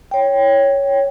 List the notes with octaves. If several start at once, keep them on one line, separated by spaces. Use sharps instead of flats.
C#5 G5